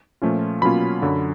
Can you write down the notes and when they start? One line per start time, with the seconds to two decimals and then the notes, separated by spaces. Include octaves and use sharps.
0.22 A#2 F3 A3 C#4 F4
0.62 B2 F#3 A#3 C#4 F4 B5
1.02 F#2 D3 F#3